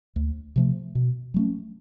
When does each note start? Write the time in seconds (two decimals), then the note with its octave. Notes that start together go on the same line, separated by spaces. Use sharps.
0.16 D2
0.56 C3 F3 A3
0.95 B2
1.34 F#3 A3 C#4